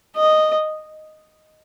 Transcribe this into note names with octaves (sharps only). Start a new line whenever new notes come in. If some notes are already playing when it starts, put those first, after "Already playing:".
D#5